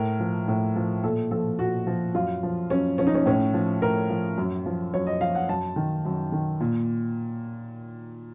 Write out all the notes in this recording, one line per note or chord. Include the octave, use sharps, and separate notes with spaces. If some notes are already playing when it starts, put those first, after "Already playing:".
Already playing: A2 A#4
F3
A2
F3
A#2 A4
F3 A4
A#2 F#4
F3
F#2 F4
F3
F#2 C#4
F3 C#4
D#4
C#4
A2 C#4
F3
A2 A#4
F3
F#2
F3
F#2 C#5
D#5
F3 F5
F#5
F#2 A5
D#3
F#2
D#3
A#2